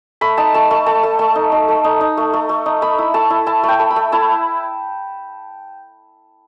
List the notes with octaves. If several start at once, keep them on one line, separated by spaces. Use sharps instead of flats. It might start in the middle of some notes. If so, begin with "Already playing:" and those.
A3 B5
D#4 A5
A3 A5
A3 A5
A3 A5
A3
A3 A5
D#4
D#4
A3
D#4
D#4
A3
A3
A3
D#4
A3 B5
E4
A3 A5
E4
E4 A5
A3 G5
A3
B5
A3
E4 A5